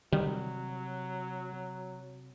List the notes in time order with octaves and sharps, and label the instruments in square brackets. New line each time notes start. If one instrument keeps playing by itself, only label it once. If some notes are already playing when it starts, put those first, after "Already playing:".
[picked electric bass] C3 [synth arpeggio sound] D#3 [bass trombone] F#3 [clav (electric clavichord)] G3